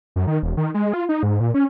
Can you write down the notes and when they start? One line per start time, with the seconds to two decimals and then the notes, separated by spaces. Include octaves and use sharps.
0.16 F#2
0.27 D#3
0.43 E1
0.57 D#3
0.74 G#3
0.93 F4
1.09 D#4
1.23 G#2
1.40 A#2
1.54 C#4